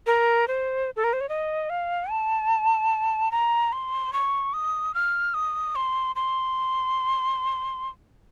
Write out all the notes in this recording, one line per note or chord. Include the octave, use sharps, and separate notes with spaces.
A#4
C5
A4
A#4
C5
C#5
D#5
F5
A5
A#5
C6
C#6
D#6
F6
D#6
C6
C6